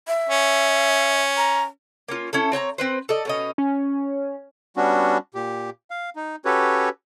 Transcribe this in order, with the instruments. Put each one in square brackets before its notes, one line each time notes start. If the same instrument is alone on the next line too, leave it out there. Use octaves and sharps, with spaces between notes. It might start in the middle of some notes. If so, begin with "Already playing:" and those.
[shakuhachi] E5
[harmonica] C#4
[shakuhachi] A#5
[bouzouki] A#3 C#4 F4
C#4 E4 A4
C4 C#5 G5 A#5
C4 B4 C5
A4 D5 D#5
B2 C#4 D#5
[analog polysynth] C#4
[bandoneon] G3 B3 C#4 D4 F#4
A#2 G4
F5
D#4
C#4 F#4 G4 A4 B4 C#5